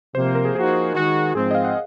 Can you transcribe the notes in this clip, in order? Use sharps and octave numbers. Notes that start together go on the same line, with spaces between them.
C3 F3 A#3 C5
A#4
G#4
F3 A#3 D#4 F#4 G#4
D#3 G#3 D#4 F#4
G#2 F3 G#3 C4 G#4
D#5
F5
F#5